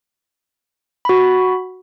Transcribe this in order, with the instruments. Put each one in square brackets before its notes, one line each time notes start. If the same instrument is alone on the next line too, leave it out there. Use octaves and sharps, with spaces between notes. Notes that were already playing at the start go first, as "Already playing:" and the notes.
[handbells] F#4 B5